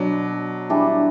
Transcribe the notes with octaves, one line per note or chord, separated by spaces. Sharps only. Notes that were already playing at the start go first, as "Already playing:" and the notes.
Already playing: B2 F#3 D4
E3 G3 D4